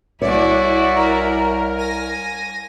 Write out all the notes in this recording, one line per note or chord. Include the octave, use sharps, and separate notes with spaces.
C2 E4 F#4 C#5 D5
A#4
G#5 A#6